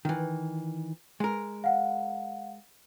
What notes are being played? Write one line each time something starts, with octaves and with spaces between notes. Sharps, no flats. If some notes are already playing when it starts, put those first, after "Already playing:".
D#3 E3
G#3 A#4
F5 F#5